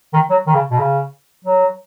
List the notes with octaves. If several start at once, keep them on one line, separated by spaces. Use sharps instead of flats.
D#3
F#3
D#3
C#3
B2
C#3
F#3